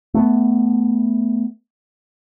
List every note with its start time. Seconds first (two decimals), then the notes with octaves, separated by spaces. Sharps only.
0.14 A3 B3